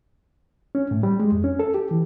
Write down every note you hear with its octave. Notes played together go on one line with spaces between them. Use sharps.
C#4
A2
G3
G#3
F2
C#4
A4
G4
E3